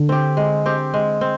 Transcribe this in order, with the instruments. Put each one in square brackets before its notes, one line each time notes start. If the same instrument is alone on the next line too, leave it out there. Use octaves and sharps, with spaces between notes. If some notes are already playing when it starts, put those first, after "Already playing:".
Already playing: [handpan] D3
[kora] C4 G4
G#3
C4 G4
G#3
C4